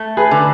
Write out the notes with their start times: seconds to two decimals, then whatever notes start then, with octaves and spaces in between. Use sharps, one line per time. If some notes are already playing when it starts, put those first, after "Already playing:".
Already playing: A3
0.17 G#4 B4
0.31 D3